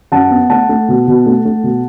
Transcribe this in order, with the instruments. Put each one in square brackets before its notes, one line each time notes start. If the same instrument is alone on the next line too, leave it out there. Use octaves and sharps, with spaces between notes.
[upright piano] F#2 F#5 A5
B3
A3 F#5 A5
A3
B2
B2
A3
A3
B2